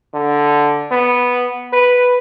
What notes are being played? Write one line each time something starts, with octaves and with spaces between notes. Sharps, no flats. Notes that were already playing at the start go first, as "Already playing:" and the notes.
D3
B3
B4